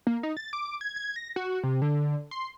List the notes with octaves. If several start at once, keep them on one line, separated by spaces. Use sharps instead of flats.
A#3
D#4
A6
D6
G#6
G#6
A#6
F#4
C3
D3
C6